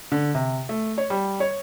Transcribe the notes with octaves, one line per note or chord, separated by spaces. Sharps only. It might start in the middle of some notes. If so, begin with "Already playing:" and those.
D3
C3
A3
C#5
G3
C#5